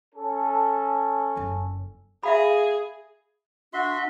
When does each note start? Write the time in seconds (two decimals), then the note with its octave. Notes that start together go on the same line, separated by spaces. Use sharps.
0.15 C#4 A4
1.36 F#1 F2
2.23 G#4 E5 F5 B5
3.73 D4 F#4 E5 C6